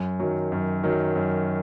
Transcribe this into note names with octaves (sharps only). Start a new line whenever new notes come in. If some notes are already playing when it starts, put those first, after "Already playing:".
Already playing: F#2
D#3 F#3
F#2
D#3 F#3
F#2